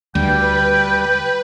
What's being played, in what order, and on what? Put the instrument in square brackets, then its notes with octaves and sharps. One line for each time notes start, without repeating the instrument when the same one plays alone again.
[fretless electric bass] D2 [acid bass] G3 [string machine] B4 [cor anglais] G5